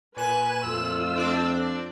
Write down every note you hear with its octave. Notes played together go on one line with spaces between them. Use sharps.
A#2 B4 G#5 F#6 E7
F2 A3 F4 E6
C4 D4 D5